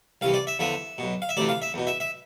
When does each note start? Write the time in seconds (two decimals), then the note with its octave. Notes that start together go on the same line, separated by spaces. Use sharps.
0.21 C2 C3 E3 F5
0.34 D5
0.47 E5
0.59 E2 D3 F3 E5
0.98 B1 B2
1.22 F5
1.29 E5
1.37 D2 C3 E3 D5
1.49 F5
1.62 E5
1.74 E2 B2
1.87 E5
2.00 E5